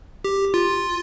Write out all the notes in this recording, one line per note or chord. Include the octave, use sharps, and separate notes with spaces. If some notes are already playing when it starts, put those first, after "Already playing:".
G4
F4